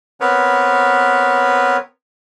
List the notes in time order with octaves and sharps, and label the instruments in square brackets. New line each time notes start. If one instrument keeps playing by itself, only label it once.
[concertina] B3 C4 A#4 B4 C#5